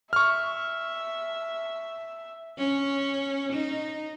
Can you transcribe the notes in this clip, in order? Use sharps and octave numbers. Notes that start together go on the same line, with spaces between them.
E5 C#6 F6
C#4
D#4